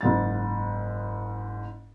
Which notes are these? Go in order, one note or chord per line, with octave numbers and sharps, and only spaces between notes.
F#1 G#2 A6